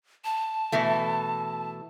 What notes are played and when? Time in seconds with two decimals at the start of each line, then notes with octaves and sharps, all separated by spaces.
0.25 A5
0.72 B2 E3 A3